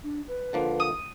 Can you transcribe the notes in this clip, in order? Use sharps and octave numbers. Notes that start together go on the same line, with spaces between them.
D4
B4
D3 F3 A#3
D#6